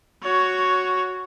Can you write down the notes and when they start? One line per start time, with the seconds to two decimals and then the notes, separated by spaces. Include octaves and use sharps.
0.23 F#4 C#5